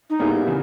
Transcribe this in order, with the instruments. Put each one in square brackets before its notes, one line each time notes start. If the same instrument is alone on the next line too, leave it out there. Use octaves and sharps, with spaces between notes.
[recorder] D#4
[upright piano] A#2 G3 B3 E4 G#4
C#3 E3